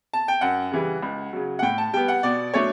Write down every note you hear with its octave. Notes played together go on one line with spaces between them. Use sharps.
A5
G5
F#2 F#5
C#3 E3 G3
C#2
C#3 F#3
F#5
A2 G5
A5
G3 B3 G5
F#5
B2 D5
F#3 A3 D4 C#5